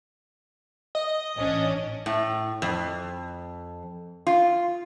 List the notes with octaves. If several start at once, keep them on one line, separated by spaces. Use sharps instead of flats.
D#5
A1 C#4 D4
A2
F2
F4